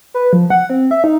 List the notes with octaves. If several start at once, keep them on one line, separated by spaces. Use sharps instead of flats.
B4
F3
F#5
C4
E5
D#4